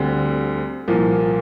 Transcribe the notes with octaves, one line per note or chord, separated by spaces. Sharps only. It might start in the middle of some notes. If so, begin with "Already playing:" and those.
Already playing: D2 D3 G3 C4
C2 A#2 F3 A#3